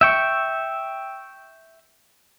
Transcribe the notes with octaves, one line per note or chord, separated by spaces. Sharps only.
E5 G5 C#6